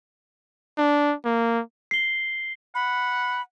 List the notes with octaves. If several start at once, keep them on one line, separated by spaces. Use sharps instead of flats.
D4
A#3
C7 G7
F#5 B5